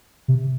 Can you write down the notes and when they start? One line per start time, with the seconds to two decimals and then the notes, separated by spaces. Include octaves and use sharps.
0.28 C3